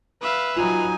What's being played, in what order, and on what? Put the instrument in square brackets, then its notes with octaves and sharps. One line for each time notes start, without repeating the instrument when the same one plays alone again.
[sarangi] B4 [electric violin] E5 F5
[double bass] F#3 D#4 [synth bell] F4 [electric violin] G#5